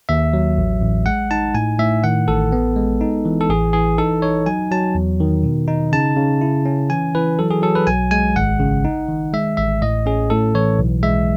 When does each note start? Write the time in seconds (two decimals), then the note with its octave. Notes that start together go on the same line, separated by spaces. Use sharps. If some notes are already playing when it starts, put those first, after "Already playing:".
0.09 D#2 E5
0.33 F#3
0.58 A1
0.82 A1
1.06 G#3 F#5
1.31 D#4 A5
1.54 A2 G#5
1.79 A2 E5
2.04 D#3 F#5
2.28 A1 A4
2.52 B3
2.76 G#3
3.01 D#4
3.25 E3
3.41 A4
3.49 A1 G#4
3.73 E3 G#4
3.98 D#4 A4
4.22 D#4 C#5
4.46 F#3 G#5
4.71 F#3 A5
4.95 E2
5.20 D#3
5.43 B2
5.68 D#4
5.93 C#3 A5
6.17 C#3
6.41 E4
6.66 C#4
6.90 E3 G#5
7.15 E3 B4
7.39 F#3 A4
7.51 G#4
7.63 F#3 A4
7.75 B4
7.87 B1 G#5
8.11 G#3 G#5
8.36 G#1 F#5
8.60 C#3
8.85 D#4
9.08 D#3
9.33 G#3 E5
9.57 A1 E5
9.82 A2 D#5
10.06 C#4 G#4
10.30 A2 A4
10.54 E3 C#5
10.79 B1
11.03 G#3 E5